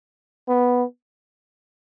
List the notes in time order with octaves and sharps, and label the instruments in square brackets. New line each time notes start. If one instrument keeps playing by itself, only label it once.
[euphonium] B3